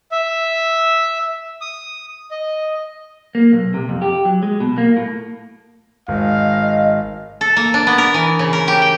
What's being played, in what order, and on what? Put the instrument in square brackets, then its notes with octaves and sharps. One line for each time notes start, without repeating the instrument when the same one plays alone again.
[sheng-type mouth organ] E5
D#6
D#5
[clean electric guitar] A#3
B1
C3
F2
G4
F#3
G#3
B2
A#3
A2
[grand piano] G#1 [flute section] D#5 [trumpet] F5
[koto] A4
A#3
D4
B3
A#4
E3
C#3
A#4
G4
G5